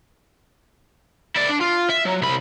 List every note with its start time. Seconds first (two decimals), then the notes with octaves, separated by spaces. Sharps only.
1.36 E4 D5
1.49 D4
1.61 F4
1.90 E5
2.06 F#3
2.22 C2 B5